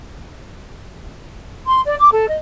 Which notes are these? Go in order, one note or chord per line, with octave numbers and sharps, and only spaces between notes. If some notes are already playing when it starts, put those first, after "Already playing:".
C6
D5
D6
A4
D#5